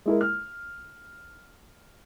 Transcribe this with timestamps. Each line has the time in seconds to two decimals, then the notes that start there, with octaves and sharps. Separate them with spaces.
0.06 G#3 E4 A#4
0.21 F6